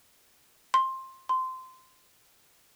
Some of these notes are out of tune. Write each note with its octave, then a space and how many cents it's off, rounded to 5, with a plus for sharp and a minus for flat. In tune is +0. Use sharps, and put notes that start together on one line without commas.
C6 +15
C6 -15